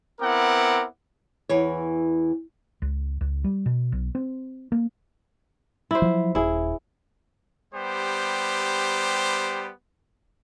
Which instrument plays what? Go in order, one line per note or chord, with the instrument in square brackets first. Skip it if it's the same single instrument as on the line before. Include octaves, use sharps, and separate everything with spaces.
[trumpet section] B3 C4 E4 A#4 F#5 D6
[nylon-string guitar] E2 E3 C#5
[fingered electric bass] C#2
C#2
G3
B2
B1
C4
A#3
[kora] E4 C5
[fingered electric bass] F3 F#3
[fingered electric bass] D#1 [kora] E4 G#4
[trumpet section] G3 B3 G4 C5